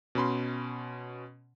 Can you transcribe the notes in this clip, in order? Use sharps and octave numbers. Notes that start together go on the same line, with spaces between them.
B2 C#4 B5 C6